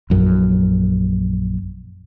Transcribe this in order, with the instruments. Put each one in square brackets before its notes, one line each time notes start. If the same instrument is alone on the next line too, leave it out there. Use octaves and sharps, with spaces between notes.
[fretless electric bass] A#1 F#2